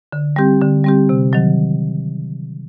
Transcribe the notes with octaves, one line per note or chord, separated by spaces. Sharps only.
D3
G3 C4 G4
D3
G3 C4 G4
C3
D#3 F#3